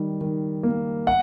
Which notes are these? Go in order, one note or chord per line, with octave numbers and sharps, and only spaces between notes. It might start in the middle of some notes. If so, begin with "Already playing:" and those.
Already playing: D#3 G3
D#3
A#3
F#5